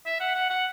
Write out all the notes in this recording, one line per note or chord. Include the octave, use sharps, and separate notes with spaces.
E5
F#5
F#5
F#5